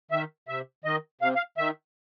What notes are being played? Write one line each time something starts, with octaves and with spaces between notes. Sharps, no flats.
D#3 E5
C3 E5
D#3 D#5
C3 F5
F5
D#3 E5